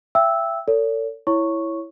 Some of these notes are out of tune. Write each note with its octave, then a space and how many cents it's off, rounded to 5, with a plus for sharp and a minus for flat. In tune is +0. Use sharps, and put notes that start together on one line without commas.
E5 +30 G5 +0 E6 -5
A4 +45 C#5 +40
E4 +0 C#5 +0 C#6 +0